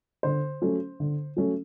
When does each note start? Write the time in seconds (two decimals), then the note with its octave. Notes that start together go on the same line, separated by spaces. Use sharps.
0.23 D3 C5
0.62 F#3 A3 C#4
1.00 D3
1.37 F#3 A3 C#4